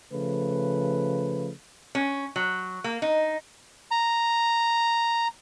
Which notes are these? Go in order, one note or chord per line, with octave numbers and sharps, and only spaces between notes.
C#3 F3 A3 B4
C#4
F#3
A#3
D#4
A#5